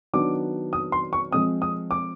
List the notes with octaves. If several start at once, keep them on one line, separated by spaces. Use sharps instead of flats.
D#3 F#3 B3 D4 D6
D#6
C6
C#6
F3 G#3 C4 D#6
D#6
D6